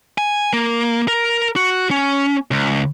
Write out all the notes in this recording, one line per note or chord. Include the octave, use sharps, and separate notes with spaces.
G#5
A#3
A#4
F#4
C#4
C#2